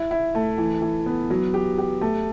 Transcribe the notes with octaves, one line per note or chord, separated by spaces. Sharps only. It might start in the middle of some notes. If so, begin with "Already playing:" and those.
Already playing: E4
E4
A3
E3
E3
B3
F#3
G4
G4
A3